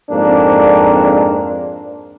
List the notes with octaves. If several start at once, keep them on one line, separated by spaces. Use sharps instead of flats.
F2 G#2 A#3 D4